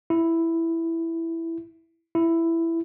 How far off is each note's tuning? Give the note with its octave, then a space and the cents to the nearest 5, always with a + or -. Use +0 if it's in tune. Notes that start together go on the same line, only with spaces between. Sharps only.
E4 +5
E4 +10